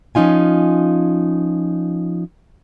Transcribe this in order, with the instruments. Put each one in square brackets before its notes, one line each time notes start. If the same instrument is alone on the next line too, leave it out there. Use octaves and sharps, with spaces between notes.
[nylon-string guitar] F3 C#4 D#4 F4 G#5